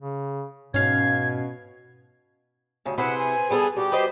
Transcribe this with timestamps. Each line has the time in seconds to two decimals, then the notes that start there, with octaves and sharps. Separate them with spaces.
0.01 C#3
0.74 G#2 B2 C#4 F5 G#6 C7
2.85 D2 G2 C#3
2.98 C3 E4 G#4 B4 C5 F#5
3.18 G#5
3.51 G3 B3 G#4 A4
3.76 G3 F#4 G4
3.92 B4 C5 D#5